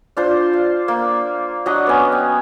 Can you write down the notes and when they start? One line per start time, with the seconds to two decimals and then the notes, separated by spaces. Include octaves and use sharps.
0.17 D4 F4 C5
0.53 F5
0.88 A#3
1.66 F#3 D4 D#5 F#5
1.87 B3 C#4
2.12 G5